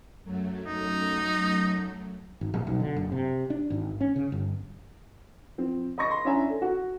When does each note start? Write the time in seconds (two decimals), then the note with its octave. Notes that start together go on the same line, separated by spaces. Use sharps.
0.23 F#2 F#3 A3
0.66 D#4
2.41 G#1
2.54 A#1
2.67 B1
2.80 D3
2.96 F#1
3.12 C3
3.50 D4
3.70 G#1
4.01 C#4
4.16 C#3
4.32 G1
5.58 F3 C4
5.98 D#5 B5 C#6 A#6
6.11 C6
6.25 C#4 D4 E4 E5 G#5 A#5
6.50 A4
6.62 F#4